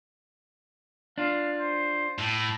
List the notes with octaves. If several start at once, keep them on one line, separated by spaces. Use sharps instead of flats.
D4 F4 F5
C5
A2